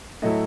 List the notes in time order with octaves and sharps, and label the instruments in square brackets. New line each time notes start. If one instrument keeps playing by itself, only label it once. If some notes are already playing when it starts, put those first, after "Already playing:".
[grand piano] A2 F#3 A3 E4 D#5